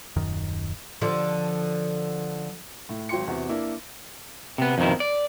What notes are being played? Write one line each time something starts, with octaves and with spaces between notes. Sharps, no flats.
D#1 F#2 D#3
D3 F3
A2
G#1 F#3 G5 C6 C#7
E2 C3 F#4
A#3 D4 E4
C3 B3
F2 B2 D#3 E4
D5